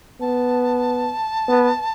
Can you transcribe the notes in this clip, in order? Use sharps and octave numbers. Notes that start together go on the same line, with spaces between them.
B3 A5
B3